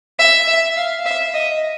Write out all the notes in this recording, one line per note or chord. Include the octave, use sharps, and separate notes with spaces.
E5
E5
F5
E5
D#5